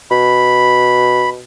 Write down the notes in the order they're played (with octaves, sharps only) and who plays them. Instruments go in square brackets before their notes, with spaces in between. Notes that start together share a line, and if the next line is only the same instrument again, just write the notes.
[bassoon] B2 [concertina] B5